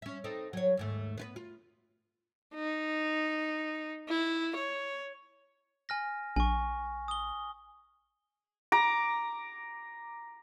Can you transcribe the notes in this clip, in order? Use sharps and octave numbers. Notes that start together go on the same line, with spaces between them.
C#4 E5
C4 D#4 A4
F#3 C#5
D#2 G#2 A3
B3 F4 B4
F4
D#4
E4
C#5
G#5 F6 A#6
A#1 G#5 C#6
D#6 G7
A#5 D6